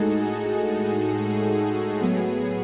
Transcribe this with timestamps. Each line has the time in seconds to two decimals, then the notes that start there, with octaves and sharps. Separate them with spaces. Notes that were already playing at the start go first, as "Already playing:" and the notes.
Already playing: A2 G#3 D#4 F#4 G#4 A4
0.20 G#4
1.29 G#4
2.01 A2 F#3 B3